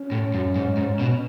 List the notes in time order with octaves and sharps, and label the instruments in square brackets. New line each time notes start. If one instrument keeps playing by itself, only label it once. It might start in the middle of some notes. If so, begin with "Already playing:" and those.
Already playing: [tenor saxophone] C#4
[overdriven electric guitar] A2
F#2
G#2
G#2
B2